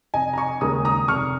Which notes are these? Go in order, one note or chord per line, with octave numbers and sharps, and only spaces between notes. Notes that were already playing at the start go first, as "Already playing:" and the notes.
F1 D#5 G#5
A#5
G#5 C#6
D#2 C#3 G#3 A#5 D#6
A#5 D#6
F1 C#6 F6